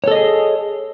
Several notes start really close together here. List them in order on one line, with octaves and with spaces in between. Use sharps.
C#5 A4 D#5 G#4